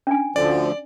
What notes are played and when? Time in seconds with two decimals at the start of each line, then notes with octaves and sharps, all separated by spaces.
0.07 C#4 D4 G#5
0.36 D2 D3 F3 D5